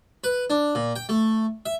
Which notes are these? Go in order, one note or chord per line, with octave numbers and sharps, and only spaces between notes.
B4
D4
A#2
G5
A3
E5